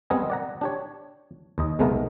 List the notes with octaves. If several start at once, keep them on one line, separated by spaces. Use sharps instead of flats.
G3 B3 C4 A#4 D#5 G#5
D5 F#5 A#5
D4 G4 C#5
D#2 D#5
B1 C3 G#3 A3 B3 A#4